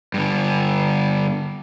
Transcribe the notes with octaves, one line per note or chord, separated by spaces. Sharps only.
G2 D3